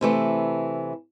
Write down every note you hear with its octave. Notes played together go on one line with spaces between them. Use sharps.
C3 E3 A3